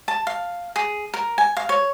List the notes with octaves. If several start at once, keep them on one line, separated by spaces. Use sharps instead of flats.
A5
F5
G#4
A#4
G#5
F5
C#5